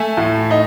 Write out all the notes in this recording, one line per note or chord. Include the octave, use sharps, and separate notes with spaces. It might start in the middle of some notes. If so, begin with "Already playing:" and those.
Already playing: A3 E5 G#5
A2
D#4